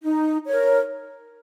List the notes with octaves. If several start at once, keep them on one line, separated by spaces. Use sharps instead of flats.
D#4
A#4 C#5